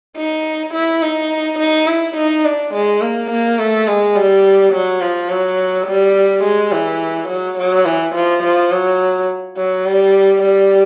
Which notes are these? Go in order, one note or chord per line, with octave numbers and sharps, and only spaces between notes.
D#4
E4
D#4
D#4
E4
D#4
D4
G#3
A#3
A#3
A3
G#3
G3
F#3
F3
F#3
G3
G#3
E3
F#3
F#3
E3
F3
F3
F#3
F#3
G3
G3